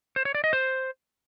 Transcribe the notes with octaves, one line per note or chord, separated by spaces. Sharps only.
C5
C#5
D5
D#5
C5